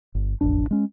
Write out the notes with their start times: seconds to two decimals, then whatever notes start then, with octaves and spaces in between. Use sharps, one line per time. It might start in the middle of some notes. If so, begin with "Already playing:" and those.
0.15 G1
0.41 E1 A1 F2 D4
0.71 G#3 C#4